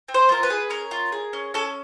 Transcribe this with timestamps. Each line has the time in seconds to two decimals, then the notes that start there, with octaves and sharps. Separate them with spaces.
0.08 C4
0.14 C5
0.29 F4 A#4
0.43 B4
0.50 G#4
0.70 C#4 A#4
0.91 F4
1.12 G#4
1.33 C#4
1.54 C#4 A4